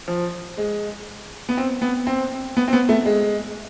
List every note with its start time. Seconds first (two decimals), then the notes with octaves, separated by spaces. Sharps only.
0.08 F3
0.58 G#3
1.49 B3
1.57 C4
1.82 B3
2.07 C4
2.57 B3
2.68 C4
2.73 B3
2.89 A3
3.05 G#3